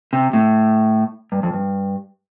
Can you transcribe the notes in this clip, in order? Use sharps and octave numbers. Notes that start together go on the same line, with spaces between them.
C3
A2
G2
F2
G2